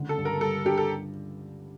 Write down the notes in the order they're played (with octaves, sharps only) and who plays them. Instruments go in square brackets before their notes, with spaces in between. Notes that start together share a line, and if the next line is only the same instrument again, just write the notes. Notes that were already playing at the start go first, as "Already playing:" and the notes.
Already playing: [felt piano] C#2 D3
[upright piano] A4
[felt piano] G2
[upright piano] A#4
[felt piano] G3 [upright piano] A4
[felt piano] D4 [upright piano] G4
[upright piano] A4